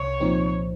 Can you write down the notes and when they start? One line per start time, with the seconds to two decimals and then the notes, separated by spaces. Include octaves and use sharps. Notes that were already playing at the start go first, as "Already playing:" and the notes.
Already playing: C2 C#5
0.20 A#2 F3 C4 D#4